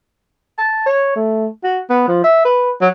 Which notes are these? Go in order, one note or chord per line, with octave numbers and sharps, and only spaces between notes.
A5
C#5
A3
F#4
B3
F3
E5
B4
F#3